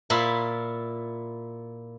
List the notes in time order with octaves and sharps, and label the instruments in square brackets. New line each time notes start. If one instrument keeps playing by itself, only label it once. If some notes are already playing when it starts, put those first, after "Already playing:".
[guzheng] A#2 E4 F4 B5